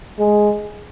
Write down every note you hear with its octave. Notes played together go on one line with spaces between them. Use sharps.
G#3